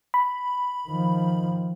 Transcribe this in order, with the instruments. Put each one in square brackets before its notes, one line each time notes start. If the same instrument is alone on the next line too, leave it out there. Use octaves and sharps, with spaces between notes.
[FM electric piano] B5
[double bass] D#3 F3